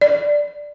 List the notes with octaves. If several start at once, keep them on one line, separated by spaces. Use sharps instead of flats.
D5